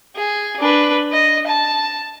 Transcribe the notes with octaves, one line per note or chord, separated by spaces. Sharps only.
G#4
D4 B4
D#5
A5